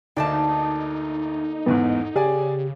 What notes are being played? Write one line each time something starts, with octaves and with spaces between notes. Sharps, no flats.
D2 D3 A#3 D#4 D5 A5 D6
A1 E2 G#2 B3
C#3 G4 G#4 D5 G#5